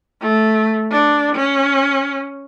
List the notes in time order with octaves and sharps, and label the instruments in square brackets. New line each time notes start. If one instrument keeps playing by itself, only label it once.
[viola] A3
D4
C#4